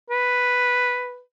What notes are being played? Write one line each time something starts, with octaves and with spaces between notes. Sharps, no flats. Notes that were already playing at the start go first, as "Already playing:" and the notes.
B4